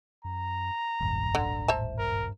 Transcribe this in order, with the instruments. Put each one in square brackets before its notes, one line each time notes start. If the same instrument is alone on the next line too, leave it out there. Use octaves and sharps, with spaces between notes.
[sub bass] F#2 [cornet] A#5
[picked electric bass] D#1 G#1 [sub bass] F#2
[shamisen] D3
[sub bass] A2 [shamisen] C5 E5 A5
[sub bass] G2 [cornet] A#4